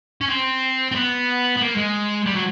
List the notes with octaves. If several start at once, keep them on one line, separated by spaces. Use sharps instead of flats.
C#4
C4
C4
B3
B3
A#3
G#3
G3
F#3